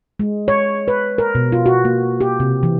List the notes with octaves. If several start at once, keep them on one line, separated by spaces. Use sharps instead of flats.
G#3
C#5
B4
A#4
B2
F4
F#4
A#3
G4
C3
E3